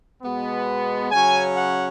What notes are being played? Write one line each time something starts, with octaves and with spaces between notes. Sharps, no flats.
B2 G#3 B3
C#3 F#3 C#4 G#5
F#5